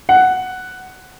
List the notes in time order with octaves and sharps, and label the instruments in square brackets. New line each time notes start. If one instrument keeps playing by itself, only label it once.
[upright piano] F#5